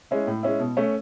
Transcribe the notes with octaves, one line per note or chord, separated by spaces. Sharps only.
G#3 C#4 E4
A2
G#3 C#4 E4
B2
A3 C#4